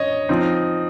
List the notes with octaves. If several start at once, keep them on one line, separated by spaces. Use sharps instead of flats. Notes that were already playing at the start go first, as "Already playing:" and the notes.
Already playing: C#5 D#5
F3 C4 D#4